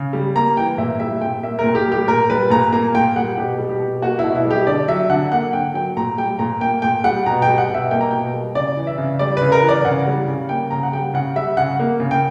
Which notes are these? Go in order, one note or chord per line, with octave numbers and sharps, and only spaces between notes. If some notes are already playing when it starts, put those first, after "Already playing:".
Already playing: C#3
G3
A#3 A#5
E3 G5
A#2 E5
G3 E5
A#2 G5
A#3 E5
A#4
A#2
G4
G3 G4
A#2 A#4
G3 B4
A#2 A#5
A#3 A#5
A#2 G5
G3 F#5
B2 G4
G3
G4
B2
A#3 F#4
E4
B2
E4
G3
G4
D3 D5
F#3 E5
D3 F#5
A#3 F#5
D3 G5
F#3 G5
A#2 A#5
G3 G5
A#2 A#5
A#3 G5
A#2 G5
G3 F#5
B2 A#5
G5
G3
F#5
B2
E5
A#3 G5
A#5
B2 G5
G3
C#3 D5
E3
E5
C#3
G3 D5
C#3 B4
A#4
E3
D5
C#3 F#5
G3
C#3
A#3 G5
C#3 A#5
F#5
G3 G5
C#3 F#5
G3 E5
C#3 F#5
A#3
C#3
G5